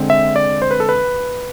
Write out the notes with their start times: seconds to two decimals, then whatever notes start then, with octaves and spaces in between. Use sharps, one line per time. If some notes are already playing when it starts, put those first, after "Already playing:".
Already playing: D3 G#3 C4
0.10 E5
0.36 D5
0.62 C5
0.71 B4
0.80 A4
0.89 B4